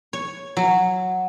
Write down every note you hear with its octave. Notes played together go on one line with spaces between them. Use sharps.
C#5
F#3